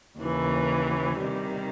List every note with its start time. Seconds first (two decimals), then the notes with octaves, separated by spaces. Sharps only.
0.19 D#2 C#3 E3
1.19 C3 D#3 G3